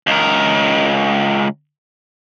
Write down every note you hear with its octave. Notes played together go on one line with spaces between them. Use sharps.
C#2 A#4